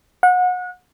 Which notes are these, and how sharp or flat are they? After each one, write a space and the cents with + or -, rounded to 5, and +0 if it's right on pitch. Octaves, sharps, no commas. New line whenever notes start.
F#5 -30